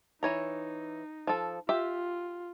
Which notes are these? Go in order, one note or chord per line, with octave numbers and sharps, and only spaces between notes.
E3 D#4 C#5 A#5
F3 A4
F4 G4 E5